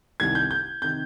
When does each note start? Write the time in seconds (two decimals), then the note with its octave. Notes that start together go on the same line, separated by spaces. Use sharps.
0.20 C2 C3 D#3 G#6
0.35 G6
0.51 G6
0.82 C3 D#3 G6